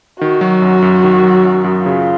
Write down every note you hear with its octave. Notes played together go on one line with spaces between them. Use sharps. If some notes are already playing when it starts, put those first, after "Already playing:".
D#3 F#4
F#3
F#2
F#2
D#3
F#3
F#2
F#2
C#3 F4